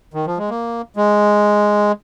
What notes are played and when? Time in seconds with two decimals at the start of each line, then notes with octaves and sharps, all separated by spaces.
0.14 D#3
0.26 F3
0.38 G#3
0.50 A#3
0.96 G#3